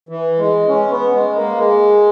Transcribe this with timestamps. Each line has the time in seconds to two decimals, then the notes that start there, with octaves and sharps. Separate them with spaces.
0.09 E3
0.38 G#3
0.68 C#4
0.90 B3
1.14 G#3
1.35 A#3
1.58 G#3